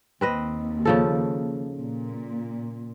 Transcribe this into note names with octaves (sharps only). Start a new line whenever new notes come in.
D#2 C4 B4 D#5
C#3 F3 A4
A#2